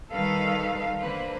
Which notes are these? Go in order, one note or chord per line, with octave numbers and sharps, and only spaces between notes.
D#3 G3 D#4 A4 B4 F5
D3 A#3 B4 C5